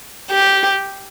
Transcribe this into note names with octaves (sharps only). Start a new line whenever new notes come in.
G4